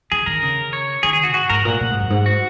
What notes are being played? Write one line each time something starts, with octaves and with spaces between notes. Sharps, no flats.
D#3 G#4
D#3 A#4
C#3
C#5
D#3 G#4
G#4
F#4
G#2 F#4
G#2 A#4
A#2 F#5
A#2
G#2
F#2
G#2
F#4